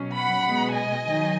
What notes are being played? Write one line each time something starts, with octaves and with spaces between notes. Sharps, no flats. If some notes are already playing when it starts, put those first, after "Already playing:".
Already playing: B2 F#3 C#4
F#5 B5
B2 G#3 B3
D#5 G#5
D#3 F#3 D#4